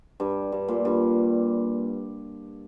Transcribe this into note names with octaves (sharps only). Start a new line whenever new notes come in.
G2
G2
A#2
G2